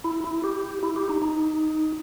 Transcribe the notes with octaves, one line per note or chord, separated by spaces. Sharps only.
E4
E4
G4
E4
G4
D#4
D#4